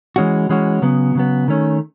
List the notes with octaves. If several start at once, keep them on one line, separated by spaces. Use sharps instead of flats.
E3 G#3 C#4 F#4
E3 G#3 C#4 F#4
C#3 F#3 B3
C#3 F#3 B3
D#3 A3 C#4